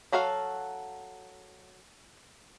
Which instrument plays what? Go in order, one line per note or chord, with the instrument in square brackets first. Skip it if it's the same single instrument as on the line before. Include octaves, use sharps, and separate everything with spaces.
[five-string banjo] F#3 F#4 A4 F5